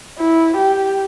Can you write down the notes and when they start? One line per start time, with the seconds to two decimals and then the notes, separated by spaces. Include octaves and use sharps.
0.19 E4
0.57 G4